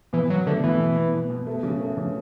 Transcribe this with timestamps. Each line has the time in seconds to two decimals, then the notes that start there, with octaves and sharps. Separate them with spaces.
0.13 B2 E3
0.30 B2 F#3
0.47 D3 A3
0.63 B2 E3
0.80 B2
0.97 B2
1.13 B2
1.30 B2
1.47 A3
1.63 C#3
1.80 A3
1.97 C#3